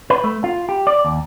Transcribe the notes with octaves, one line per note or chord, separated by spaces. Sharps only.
B4
A3
F4
G4
D5
D#2